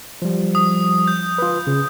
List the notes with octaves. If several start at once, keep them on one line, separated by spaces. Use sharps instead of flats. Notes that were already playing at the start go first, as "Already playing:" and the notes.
F3 G3
D#6
G6
F4 B4
C#3